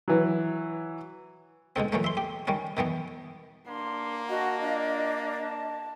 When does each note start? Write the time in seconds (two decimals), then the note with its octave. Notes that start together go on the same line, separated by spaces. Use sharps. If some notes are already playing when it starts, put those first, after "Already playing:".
0.08 E3 F#3
1.76 G#2 B2 D3 C4
1.92 A#2 E3 F#3 A3
2.04 E5 C6
2.17 G4
2.47 D#3 G3 C#4
2.77 B2 D#3 E3 B3
3.68 A#3 D4 C6
4.29 F#4 D#5 F#5 A5
4.61 D4 F4 F5
5.38 A5